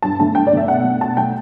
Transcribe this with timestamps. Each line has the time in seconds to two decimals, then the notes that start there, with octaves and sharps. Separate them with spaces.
0.02 G2 A5
0.19 D3 A3 A5
0.35 G2 G5
0.47 D5
0.52 D3 A3 E5
0.68 B2 F#5
0.84 A3
1.00 B2 A5
1.17 A3 G5